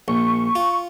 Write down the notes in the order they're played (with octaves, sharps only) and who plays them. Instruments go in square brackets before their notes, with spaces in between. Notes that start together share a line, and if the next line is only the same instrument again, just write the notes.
[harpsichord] A#1 [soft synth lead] C#6
[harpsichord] F4